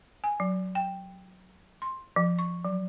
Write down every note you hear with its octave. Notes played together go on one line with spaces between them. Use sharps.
G#5
F#3
G5
C6
F3
C#6
F#3